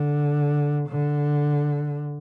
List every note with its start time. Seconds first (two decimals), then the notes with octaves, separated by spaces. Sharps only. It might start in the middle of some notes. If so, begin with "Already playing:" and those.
Already playing: D3
0.89 D3